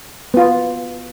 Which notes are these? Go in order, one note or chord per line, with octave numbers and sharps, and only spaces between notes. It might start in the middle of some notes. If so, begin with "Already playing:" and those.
B3 F4